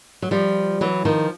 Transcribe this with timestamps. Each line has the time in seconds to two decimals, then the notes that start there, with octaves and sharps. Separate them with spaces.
0.22 F#3
0.31 F3 G3
0.81 E3 F#3
1.05 D#3 F3